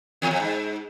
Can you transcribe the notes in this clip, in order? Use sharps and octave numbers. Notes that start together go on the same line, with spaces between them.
E2
F2
G#2